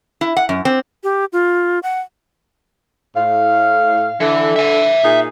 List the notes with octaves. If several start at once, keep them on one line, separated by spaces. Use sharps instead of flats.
E4
F#5
F#2
C4
G4
F4
F#5
A2 F5
D3 E3 A4
E5 G#5
A#2 D#4 G#4